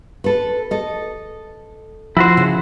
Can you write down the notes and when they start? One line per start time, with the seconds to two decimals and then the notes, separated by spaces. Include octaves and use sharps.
0.24 A4 B4
0.71 A4 D#5
2.17 F3 E4 F#4 C5
2.37 C#3